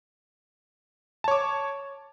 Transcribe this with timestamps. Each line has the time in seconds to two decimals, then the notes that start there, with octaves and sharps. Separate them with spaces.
1.24 A5
1.28 C#5
1.31 D6